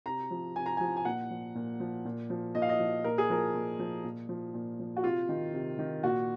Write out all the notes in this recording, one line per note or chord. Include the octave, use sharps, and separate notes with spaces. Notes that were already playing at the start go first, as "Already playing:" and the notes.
C3 A#5
F3
C3 G#5
A#5
F3 G#5
G#5
A#2 F#5
F3
A#2
F3
A#2
F3
A#2 D#5
F5
D#5
F3
A#2 A#4
G#4
F3 A#4
A#2
F3
A#2
F3
A#2
F3
F#4
C3 F4
D#3
C3
D#3
A#2 F#4